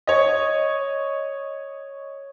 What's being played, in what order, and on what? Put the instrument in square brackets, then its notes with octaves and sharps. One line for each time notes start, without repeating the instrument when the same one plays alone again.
[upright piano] C#5 D#5